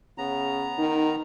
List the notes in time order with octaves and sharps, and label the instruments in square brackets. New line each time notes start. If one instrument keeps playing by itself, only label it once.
[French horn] C#3 [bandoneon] B3 A#5
[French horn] D#3 [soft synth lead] D#4